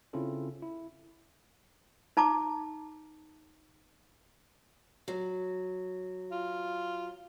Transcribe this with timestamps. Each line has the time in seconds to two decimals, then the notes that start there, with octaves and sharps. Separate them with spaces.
0.13 C#3 C4 C#4 E4 F4 A4
0.62 E4
2.17 D#4 A5 A#5 D6
5.08 F#3
6.31 F4